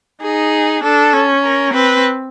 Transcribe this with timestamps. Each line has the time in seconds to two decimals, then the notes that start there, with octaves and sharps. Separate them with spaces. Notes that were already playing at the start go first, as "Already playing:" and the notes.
0.22 D#4 G#4
0.83 D4 A4
1.13 C#4
1.44 A#4
1.74 C4 B4